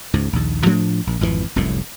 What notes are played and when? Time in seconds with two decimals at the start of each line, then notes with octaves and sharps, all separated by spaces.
0.14 C#2 G#2
0.33 A#1 D#2
0.66 A2 F3 A3 D4
1.07 A#1
1.21 G#1 F2 C3 E3
1.56 F1 C2 F#2 A2